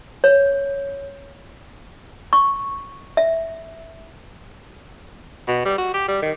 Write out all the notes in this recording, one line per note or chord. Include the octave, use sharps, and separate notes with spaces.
C#5
C#6
E5
B2
G3
F#4
G4
G3
D#3